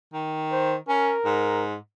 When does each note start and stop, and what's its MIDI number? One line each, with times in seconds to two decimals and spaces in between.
0.13 0.75 51
0.52 0.77 72
0.88 1.12 61
0.88 1.65 70
1.25 1.76 44